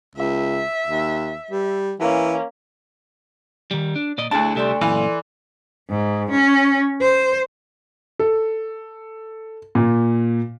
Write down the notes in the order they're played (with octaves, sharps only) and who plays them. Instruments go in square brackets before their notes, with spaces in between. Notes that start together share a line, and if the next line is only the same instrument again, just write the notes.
[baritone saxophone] C#2 [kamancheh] E5
[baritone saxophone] D#2
G3
[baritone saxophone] E3 [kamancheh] A#3 C#4
[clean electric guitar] D#3 G3
D4
A#2 D5 D#5
[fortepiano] D2 A5 [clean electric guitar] D4 E4 G#4
[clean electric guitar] C2 G4 E5 [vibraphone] A4 D5 C6
[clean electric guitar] F#2 A#2 F5 [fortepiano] E3
[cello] G#2
C#4
C5
[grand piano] A4
A#2